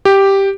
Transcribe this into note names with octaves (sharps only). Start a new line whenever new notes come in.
G4